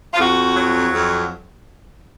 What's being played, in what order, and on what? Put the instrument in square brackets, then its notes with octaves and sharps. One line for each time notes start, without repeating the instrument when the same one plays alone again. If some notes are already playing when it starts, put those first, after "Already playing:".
[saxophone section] F4
F2 F#4
F#3
F2